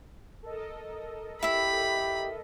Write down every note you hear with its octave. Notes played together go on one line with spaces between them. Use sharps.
A4 A#4 D#5
E4 G4 E5 B5